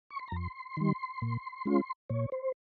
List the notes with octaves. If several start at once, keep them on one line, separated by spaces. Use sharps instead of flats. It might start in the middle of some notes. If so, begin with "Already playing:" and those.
C#6
C6
A#5
F2 C6
D#3 G3
A#2
G#3 C#4 F4
A#2 C#5
C5